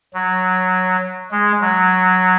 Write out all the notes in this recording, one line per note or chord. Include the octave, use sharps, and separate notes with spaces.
F#3
G#3
F#3